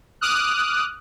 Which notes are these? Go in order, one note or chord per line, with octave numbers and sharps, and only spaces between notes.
D6 D#6 F6 F#6